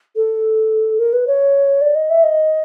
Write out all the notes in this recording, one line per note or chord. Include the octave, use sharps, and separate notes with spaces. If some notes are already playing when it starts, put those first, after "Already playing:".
A4
A#4
B4
C#5
D5
D#5
E5
D#5